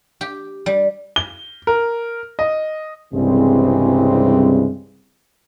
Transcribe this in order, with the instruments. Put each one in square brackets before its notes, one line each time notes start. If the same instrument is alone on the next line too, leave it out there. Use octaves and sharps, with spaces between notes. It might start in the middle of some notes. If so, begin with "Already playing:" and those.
[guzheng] G4
G3
[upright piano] G7
A#4
D#5
[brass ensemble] C2 G2 C#3 E3 G#3 C4